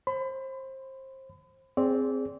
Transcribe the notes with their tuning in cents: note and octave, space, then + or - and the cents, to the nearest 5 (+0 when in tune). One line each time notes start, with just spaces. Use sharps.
C5 +25 B5 +35
C4 +0 G#4 +0 D5 -30